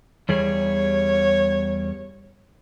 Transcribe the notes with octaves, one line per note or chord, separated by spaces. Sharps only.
E2 G3 G#4 C#5